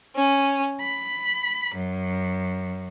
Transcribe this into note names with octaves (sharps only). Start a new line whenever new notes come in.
C#4
B5
F#2